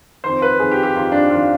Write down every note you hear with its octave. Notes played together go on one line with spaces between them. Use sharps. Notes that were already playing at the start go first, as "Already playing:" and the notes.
F2 D#3 C5
B4
F2 D#3 G#4
G4
G4
F2 D#3 F4
D4
F2 D#3 F4